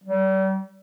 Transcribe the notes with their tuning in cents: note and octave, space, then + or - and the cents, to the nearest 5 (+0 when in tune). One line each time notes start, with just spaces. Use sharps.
G3 -40